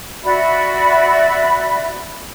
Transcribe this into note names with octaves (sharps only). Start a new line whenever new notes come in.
F#4 D5 E5 B5